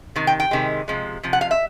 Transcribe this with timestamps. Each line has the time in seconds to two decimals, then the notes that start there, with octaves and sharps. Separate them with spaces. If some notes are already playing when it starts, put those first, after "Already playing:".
0.16 C3 D#3
0.27 G5
0.40 G5
0.51 C3 D#3 G#3
0.88 C3 F3 G#3
1.23 C3 F3
1.33 F#5
1.41 F5
1.51 E5